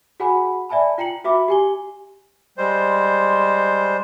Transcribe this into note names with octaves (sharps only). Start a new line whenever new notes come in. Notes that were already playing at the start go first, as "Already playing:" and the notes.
F#4 G#4 F#5 G#5 B5
D5 E5 G#5 A5 B5
F4 G5 A#5 C#7 F#7
F#4 E5 B5 D6
G4 G#5 G7
G3 G#3 C5